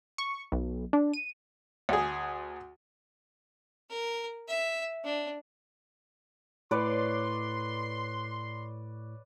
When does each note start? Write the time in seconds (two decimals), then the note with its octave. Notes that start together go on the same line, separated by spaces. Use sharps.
0.18 C#6
0.52 B1
0.93 D4
1.13 D#7
1.89 D2 G#4
3.90 A#4
4.48 E5
5.04 D4
6.71 A2 B4 C#5 D5 C6